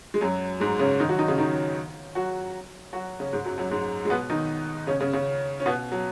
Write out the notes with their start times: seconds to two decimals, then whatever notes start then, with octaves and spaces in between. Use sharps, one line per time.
0.14 G#3
0.21 F#2 F#3
0.60 G#2 G#3
0.79 C#3 C#4
1.00 D#3 D#4
1.09 F#3 F#4
1.19 D#3 D#4
1.28 C#3 C#4
1.38 D#3 D#4
2.15 F#3 F#4
2.93 F#3 F#4
3.20 C#3 C#4
3.33 G#2 G#3
3.45 F#2 F#3
3.58 F#2 F#3
3.71 G#2 G#3
4.05 G#3
4.10 B2 B3
4.30 D#3 D#4
4.87 C#3 C#4
5.00 C#3 C#4
5.13 C#3 C#4
5.60 C#4
5.66 B2 B3
5.92 F#3